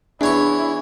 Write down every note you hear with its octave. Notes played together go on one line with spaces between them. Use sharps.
E2 D4 E4 C#5 C#6